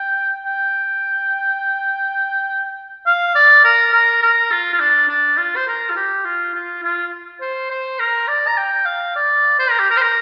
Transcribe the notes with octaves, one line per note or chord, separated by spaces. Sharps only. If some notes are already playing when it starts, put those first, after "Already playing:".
Already playing: G5
G5
F5
D5
A#4
A#4
A#4
F4
F4
D4
D4
F4
C5
A#4
F4
G4
F4
F4
F4
C5
C5
A#4
D5
A#5
G5
F5
D5
C5
A#4
G4
A#4
C5
A#4